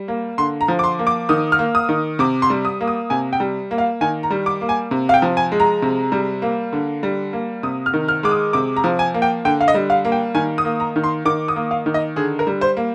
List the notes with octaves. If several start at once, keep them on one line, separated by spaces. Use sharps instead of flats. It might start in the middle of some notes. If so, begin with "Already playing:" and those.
Already playing: G3
A#3
D3 C6
A#5
F3
D6
C6
A#3
D6
D#3 D#6
F6
A#3
D#6
D#3
C3 D6
C6
G3
D#6
A#3
D#6
C3 G#5
G5
G3
A#3
F5
D#3 G#5
A#5
G3
D6
A#3
G#5
C3
F5
G5
F3
G#5
G#3
A#5
C3
G3
A#3
D3
G3
A#3
C3 D#6
F6
D#3
F6
G#3 D6
D#6
C3 D6
A#5
F3
G#5
A#3
G5
D3 G5
F5
D#5
G3
F5
A#3
G5
D#3 G#5
D#6
A#3
A#5
D#3
C6
D#3 D6
D#6
A#3
F5
D#3
D#5
D3 G#4
A#4
G3
C5
A#3